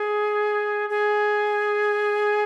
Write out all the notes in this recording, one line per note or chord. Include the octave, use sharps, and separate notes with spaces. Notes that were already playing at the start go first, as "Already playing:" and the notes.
Already playing: G#4
G#4